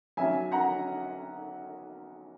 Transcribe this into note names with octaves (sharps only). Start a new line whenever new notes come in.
B1 B2 F#3 C#4 E5 G#5
F#5 A#5